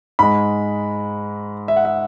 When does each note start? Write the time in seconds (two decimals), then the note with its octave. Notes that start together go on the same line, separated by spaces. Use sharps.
0.19 G#2 G#3 B5
1.68 E5
1.77 F#5
1.85 E5